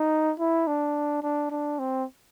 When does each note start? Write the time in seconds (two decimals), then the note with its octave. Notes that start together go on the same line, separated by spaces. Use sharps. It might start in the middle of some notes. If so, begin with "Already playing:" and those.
Already playing: D#4
0.39 E4
0.67 D4
1.22 D4
1.51 D4
1.79 C4